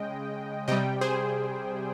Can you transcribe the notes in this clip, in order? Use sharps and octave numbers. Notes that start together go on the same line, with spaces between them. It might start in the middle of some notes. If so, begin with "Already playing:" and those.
Already playing: C#3 G#3 D#5 G5
C3 G3 D#5 G5
G#4 C5